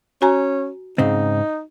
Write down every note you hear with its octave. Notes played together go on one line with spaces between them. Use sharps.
C#4 F#4 G#5 A#5
G#2 C#3 C4 D#4